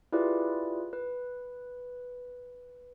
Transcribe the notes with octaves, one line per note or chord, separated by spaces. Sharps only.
E4 F4 G4 G#4 B4 D5
B4